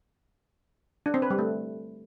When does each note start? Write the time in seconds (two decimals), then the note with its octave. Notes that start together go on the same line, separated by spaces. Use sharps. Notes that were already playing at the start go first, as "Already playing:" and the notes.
1.06 D4
1.14 C4
1.22 B4
1.30 G3
1.39 A3